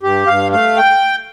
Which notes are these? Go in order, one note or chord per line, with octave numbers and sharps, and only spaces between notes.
G2 G4
G2 F5
A3 F5
G5